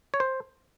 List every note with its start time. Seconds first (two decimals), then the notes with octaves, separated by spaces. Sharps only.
0.14 C#5
0.20 C5